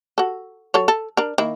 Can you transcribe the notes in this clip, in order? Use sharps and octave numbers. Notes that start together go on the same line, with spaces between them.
F#4 A4
F#3 A4 C#5
A4
D4 A#4
D#3 A#3 E4